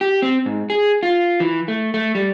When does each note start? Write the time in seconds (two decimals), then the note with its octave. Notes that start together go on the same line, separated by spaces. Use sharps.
0.01 G4
0.22 C4
0.46 G#2
0.70 G#4
1.03 F4
1.40 E3
1.68 A3
1.94 A3
2.15 G3